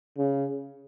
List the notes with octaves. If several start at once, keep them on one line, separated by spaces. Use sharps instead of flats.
C#3